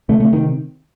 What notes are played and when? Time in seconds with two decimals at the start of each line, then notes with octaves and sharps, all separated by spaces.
0.09 C3 A3
0.20 C3 A3
0.33 D#3